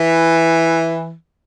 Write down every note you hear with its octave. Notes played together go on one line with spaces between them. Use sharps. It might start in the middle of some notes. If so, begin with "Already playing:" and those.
Already playing: E3